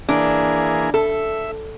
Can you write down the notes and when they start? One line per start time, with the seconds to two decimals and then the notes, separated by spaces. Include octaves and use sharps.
0.09 E3 A#3 D4 G#4
0.94 A4 E5